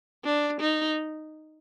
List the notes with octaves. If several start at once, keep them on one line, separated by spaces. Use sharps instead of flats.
D4
D#4